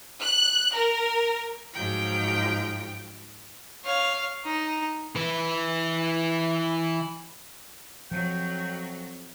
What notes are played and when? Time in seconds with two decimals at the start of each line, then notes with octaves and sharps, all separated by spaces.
0.20 F#6
0.73 A#4
1.72 G#2 F3 F#3 G5
3.84 C#5 F5
4.44 D#4
5.15 E3 B4
8.11 F2 F3 F#3 G5